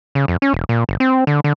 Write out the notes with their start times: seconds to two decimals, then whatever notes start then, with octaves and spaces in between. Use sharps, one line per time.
0.15 C#3
0.28 F2
0.42 C#4
0.53 E1
0.69 A#2
0.89 G1
1.00 C4
1.27 D3
1.44 D3